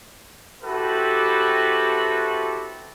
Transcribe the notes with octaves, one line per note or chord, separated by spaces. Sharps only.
C4 E4 F#4 G4 A4 B4